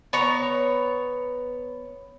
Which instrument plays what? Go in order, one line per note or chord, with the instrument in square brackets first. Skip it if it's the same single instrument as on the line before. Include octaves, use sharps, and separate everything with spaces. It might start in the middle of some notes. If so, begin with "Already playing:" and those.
[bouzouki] B3 C#5 A#5